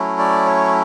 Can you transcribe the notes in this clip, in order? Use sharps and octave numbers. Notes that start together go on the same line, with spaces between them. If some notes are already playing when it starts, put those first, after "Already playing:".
Already playing: F#3 A3 C#4 E4
D5
C#5